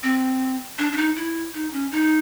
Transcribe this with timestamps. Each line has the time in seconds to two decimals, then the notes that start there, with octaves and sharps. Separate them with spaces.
0.03 C4
0.79 D4
0.92 D4
0.97 D#4
1.16 E4
1.54 D#4
1.73 C#4
1.92 D#4